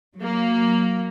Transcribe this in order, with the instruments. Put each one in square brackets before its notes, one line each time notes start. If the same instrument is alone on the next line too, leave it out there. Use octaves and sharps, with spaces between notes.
[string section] F#3 A#3